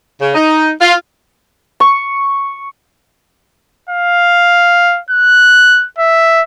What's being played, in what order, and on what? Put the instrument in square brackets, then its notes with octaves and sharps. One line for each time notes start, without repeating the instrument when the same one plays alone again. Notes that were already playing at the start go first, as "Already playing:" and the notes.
[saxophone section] C#3
D#4
F4
[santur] C#6
[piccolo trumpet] F5
F#6
E5